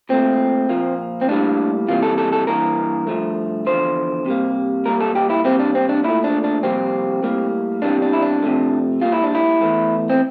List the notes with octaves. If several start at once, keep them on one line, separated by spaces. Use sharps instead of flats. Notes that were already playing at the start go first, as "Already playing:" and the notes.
A#2 A3 C4
A#2 F3 A#3
C4
A2 G3 A#3 D4
C3 E3 G3 A#3 F4
A4
A4
A4
G2 E3 A#3 A#4
G2 F3 A3
E2 D3 F3 C5
C3 G3 A#3
A#2 G3 A#3 A#4
A4
G4
E4
C3 G3 A#3 C4
D4
C4
D4
A#2 A3 E4
D4
D4
F2 C3 G3 A#3 C4
A2 G3 A#3
E2 C3 E3 G3 A#3 D4
D4
E4
D4
C3 F3 A3
A#2 G3 A#3 F4
E4
D4
E4
E2 E3 A3
C4